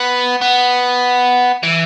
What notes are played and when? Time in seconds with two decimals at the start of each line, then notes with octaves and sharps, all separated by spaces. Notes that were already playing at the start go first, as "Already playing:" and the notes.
Already playing: B3
0.41 B3
1.63 E3